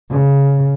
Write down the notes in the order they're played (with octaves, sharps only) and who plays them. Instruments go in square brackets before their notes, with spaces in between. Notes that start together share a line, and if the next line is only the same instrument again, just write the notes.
[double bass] C#3